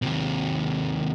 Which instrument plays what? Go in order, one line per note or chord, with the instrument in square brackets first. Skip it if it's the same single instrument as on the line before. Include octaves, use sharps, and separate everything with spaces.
[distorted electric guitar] D#2 C3